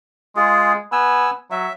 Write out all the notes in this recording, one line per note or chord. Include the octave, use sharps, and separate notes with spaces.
G#3 F4 G#4
B3 G#5 E6
F#3 E5